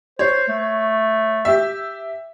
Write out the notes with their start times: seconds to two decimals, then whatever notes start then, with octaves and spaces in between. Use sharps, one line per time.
0.19 C5 C#5
0.48 A3
1.45 G4 E5